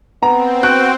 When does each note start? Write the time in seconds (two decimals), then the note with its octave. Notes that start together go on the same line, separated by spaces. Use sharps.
0.23 B3 C4 A#5
0.63 F#4 G5 F#6